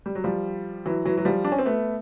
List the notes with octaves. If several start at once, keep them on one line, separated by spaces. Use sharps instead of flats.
G3
F#3
F3 G3
E3 F#3
E3 F#3
F#3
F3 G3
D4
C#4
C4
A3 B3